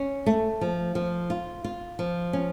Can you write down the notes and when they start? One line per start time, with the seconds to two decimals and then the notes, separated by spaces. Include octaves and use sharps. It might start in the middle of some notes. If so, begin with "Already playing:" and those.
Already playing: C#4
0.26 A3
0.61 F3
0.95 F3
1.30 F4
1.64 F4
1.99 F3
2.33 C#4